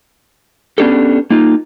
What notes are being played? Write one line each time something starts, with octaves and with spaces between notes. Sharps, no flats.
B3 C#4 D4 G4 A4
A#3 D#4 F4